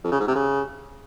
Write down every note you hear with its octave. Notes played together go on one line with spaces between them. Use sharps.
F2
C#3
G#2
C3
C#3